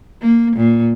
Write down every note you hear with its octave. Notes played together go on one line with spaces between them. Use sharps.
A#3
A#2